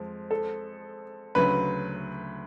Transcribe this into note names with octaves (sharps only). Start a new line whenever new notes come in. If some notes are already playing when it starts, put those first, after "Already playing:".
Already playing: F2 F3 G#3
A4
D2 C#3 F#3 B4